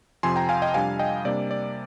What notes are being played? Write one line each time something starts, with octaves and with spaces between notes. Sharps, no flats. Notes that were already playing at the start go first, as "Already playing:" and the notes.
F2 C3 F3 G#5 C6
G5 A#5
F5 G#5
D#5 G5
F2 C3 G3 D4 F5 G#5
D#5 G5
C3 G3 A#3 D4 D5
D5